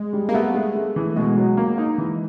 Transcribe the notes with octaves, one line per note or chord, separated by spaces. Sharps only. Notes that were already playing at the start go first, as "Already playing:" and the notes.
Already playing: G#3
G3
A#3
A3 B3
G#3
G#3
E3
B2 G#3
F#3
A#3
D#4
E3